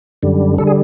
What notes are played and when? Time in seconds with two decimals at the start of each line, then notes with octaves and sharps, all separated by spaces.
0.23 F#2 D3 G3
0.58 D3 G3 A4
0.67 G#4